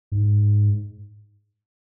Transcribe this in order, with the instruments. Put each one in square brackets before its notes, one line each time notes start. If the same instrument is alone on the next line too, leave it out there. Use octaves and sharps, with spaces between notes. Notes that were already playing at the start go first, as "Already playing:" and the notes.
[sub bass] G#2